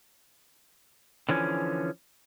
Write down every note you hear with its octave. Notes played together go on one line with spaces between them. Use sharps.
D3 E3 F3 C#4